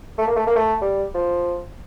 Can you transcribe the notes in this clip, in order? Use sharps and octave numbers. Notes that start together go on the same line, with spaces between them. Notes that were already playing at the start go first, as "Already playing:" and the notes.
A3
A#3
A3
A#3
A3
G3
F3